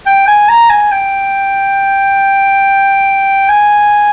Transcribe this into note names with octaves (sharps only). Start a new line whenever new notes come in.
G5
G#5
A#5
G#5
G5
G#5